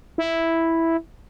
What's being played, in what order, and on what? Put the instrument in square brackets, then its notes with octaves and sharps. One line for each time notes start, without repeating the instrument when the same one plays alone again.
[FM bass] E4